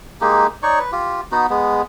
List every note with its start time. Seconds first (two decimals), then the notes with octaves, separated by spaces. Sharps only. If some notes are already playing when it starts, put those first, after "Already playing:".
0.21 G#3 A#3 D#4 G4
0.63 D#4 C#5 D5 C#6
0.79 B4
0.92 F4 G4
1.32 B3 D#4 F#4
1.50 G#3 B3